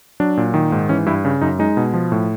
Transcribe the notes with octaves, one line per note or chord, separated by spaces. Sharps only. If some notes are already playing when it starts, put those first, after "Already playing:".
F#3 D4
A#2
D#3
G#2
E3 C#4
G2 E4
C#3
F#2 D#4
G#3 D#4
B2
F3
A2